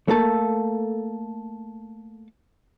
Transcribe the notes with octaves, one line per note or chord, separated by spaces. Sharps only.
A3 A#3 A4